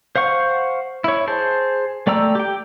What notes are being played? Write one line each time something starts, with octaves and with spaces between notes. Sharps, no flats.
C5 F5 F#5 C#6
E4 C#5
G#4 C5 A5
A3 D5 G5 A#5 E6
G4 G5